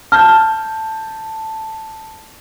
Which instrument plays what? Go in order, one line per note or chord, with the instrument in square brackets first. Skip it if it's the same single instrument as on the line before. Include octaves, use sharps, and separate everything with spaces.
[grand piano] A5 G6 [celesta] F6